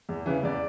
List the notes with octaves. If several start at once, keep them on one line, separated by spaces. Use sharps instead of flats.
E2
C#3 E3
E2 D5